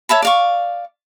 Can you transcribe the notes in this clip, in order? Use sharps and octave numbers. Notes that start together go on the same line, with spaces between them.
C#5 E5 A5 B5
D5 F5 C#6